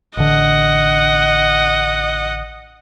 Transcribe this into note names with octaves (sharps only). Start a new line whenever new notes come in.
A1 D3 D#5 F#5